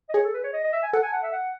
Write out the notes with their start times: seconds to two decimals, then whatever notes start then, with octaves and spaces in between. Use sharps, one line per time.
0.09 D#5
0.14 G#4 C#5
0.24 A4
0.33 B4
0.44 C#5
0.53 D#5
0.64 D#5
0.73 E5
0.83 G#5
0.93 A4 F#5
1.03 G#5
1.12 F#5
1.23 E5
1.33 F#5